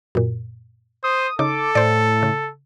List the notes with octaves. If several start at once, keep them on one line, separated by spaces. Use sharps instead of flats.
F#2 A#2
C5 D#6
C#3 D#4 A4 D6
A2 C5 D5
C#3